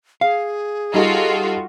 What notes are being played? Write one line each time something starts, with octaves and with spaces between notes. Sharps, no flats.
G#4 F5
G3 D#4 F4 F#4 A4